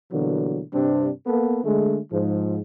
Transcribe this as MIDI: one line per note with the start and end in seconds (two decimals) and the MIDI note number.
0.12 0.61 47
0.12 0.61 50
0.12 0.61 52
0.12 0.61 54
0.12 0.61 55
0.12 0.61 58
0.74 1.10 43
0.74 1.10 48
0.74 1.10 55
0.74 1.10 60
0.74 1.10 62
1.27 1.60 58
1.27 1.60 59
1.27 1.60 69
1.64 1.98 50
1.64 1.98 56
1.64 1.98 57
2.12 2.60 44
2.12 2.60 53